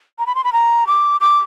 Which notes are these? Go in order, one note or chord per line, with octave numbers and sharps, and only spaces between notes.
A#5
B5
C6
B5
A#5
D6
D6